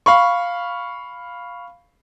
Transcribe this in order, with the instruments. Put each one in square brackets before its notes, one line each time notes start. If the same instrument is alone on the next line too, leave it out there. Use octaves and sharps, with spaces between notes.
[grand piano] F5 B5 C#6